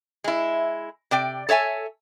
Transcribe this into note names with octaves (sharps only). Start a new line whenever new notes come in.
G#3 E4
C3 D5 G5
A4 C#5 E5 G#5